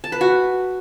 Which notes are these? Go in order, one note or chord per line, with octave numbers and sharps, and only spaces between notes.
A5
B4
F#4